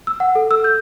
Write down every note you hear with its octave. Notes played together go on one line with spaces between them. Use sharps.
E6
F#5
A4
E6
G6